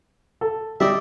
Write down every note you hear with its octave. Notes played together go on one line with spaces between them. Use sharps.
A4
G3 D#4 D5 E5